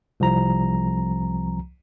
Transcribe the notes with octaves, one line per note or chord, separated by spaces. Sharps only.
C2 F3 A#5